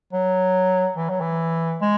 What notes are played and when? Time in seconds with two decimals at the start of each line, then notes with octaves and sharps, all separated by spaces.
0.13 F#3
0.97 E3
1.09 F#3
1.21 E3
1.82 G#3